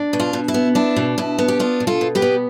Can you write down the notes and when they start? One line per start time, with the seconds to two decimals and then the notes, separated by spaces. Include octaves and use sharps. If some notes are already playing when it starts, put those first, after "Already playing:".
Already playing: D4
0.13 B2
0.20 F4
0.33 B2
0.48 E4
0.54 B3
0.75 D4 E4
0.96 B2
1.18 B2 E4
1.38 B3
1.48 G4
1.59 D4 F4
1.80 B2
1.87 F4 A4
2.01 B2
2.15 G4 B4
2.22 B3